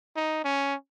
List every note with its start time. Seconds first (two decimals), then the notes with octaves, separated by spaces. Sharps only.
0.17 D#4
0.45 C#4